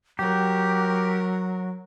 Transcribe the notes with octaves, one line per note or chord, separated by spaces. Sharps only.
F#3 G4 A#4